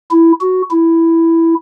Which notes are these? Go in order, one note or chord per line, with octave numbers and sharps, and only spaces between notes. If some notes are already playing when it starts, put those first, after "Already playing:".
E4
F#4
E4